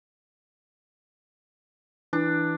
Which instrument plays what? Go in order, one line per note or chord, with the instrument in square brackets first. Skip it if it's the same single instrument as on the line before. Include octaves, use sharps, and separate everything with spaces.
[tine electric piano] E3 [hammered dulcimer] D4